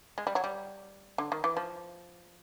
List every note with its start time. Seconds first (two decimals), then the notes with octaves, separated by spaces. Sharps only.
0.18 G#3
0.27 G3
0.35 F#3
0.44 G3
1.18 D3
1.32 D#3
1.44 E3
1.57 F3